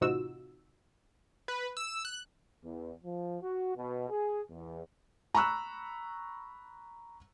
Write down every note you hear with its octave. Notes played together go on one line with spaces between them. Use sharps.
A1 C3 D#4 F4 F#4 E6
B4
E6
F#6
E2
F3
F#4
B2
G#4
E2
A#5 B5 C#6 E6 F#6